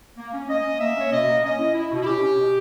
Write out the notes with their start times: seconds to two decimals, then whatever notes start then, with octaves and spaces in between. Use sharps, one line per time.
0.18 A#3
0.33 C#4
0.49 A#3 D#5
0.64 C#4
0.80 A#3 E5
0.96 C#4 C#5
1.12 B2 D#5
1.27 A#3
1.43 C#4 D#5
1.59 E4
1.74 E4
1.91 B2
2.02 E4
2.06 C#4 G4
2.22 C#4
2.38 B2